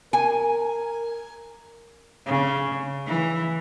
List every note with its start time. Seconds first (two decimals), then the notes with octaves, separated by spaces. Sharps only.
0.13 A#4 G#5
2.26 C#3
3.06 E3